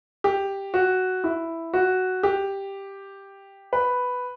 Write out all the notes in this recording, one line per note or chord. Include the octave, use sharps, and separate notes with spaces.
G4
F#4
E4
F#4
G4
B4